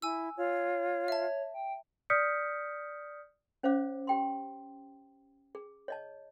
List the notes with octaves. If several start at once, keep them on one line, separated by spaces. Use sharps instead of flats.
E4 G#5 E6
F4 C#5
E5 A5
G5
D5 D#6 F6 G6 B6 C#7
C#4 C5 C#5 F5 D6
G4 G5 C6
G#4
C#5 D#5 A5